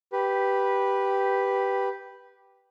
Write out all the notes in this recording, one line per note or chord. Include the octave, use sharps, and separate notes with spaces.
G4 B4